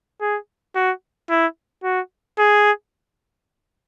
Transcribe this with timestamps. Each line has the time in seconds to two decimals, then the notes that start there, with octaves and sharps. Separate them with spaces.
0.21 G#4
0.75 F#4
1.30 E4
1.84 F#4
2.38 G#4